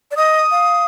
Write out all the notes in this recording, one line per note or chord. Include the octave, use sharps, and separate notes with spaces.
D5
D#5 D#6
F5